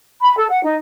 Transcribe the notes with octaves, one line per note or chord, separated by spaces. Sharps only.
B5
A4
F#5
D#4